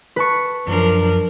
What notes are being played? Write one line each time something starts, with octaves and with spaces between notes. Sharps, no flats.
B4 A5 C#6
F#2 F3 D4 A#4